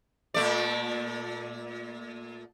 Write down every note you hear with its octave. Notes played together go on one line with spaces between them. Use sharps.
A#2 A3 D5